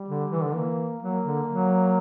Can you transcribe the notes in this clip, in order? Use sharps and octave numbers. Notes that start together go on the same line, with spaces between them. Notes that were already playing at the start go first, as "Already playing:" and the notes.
Already playing: G3
D3
E3
D3
E3 A#3
F#3 A#3
D3
F#3